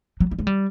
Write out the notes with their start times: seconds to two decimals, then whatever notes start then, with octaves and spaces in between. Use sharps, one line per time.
0.20 F#3
0.31 G3
0.39 G#3
0.47 G3